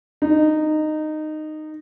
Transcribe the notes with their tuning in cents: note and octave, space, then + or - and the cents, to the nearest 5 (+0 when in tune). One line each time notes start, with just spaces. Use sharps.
D#4 -15